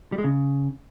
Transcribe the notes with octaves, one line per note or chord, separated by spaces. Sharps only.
G3
G#3
C#3